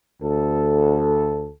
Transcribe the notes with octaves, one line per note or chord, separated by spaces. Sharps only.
D2 A4